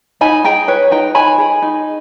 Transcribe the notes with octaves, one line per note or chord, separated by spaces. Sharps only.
D#4 G#5 B5
G#4 G5 A#5
B4 C#5
D#4 G5 A#5
D#4 G#5 B5
G#4
D#4